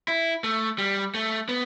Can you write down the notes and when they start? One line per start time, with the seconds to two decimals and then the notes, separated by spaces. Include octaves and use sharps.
0.08 E4
0.44 A3
0.78 G3
1.14 A3
1.49 B3